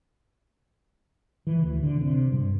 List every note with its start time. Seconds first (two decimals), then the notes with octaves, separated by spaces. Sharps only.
1.47 E3
1.63 D2
1.83 D3
2.01 C3
2.32 G2